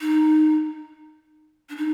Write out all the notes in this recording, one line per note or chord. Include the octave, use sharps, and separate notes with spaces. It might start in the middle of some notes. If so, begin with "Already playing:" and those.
D#4
D4
D#4